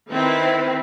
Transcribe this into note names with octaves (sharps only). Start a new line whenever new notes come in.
D#3 C4 E4 B4